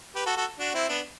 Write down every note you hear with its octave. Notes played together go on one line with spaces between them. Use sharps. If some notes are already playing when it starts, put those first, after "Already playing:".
G4 B4
F#4 A4
F#4 A4
D4 F#4
C4 E4
B3 D4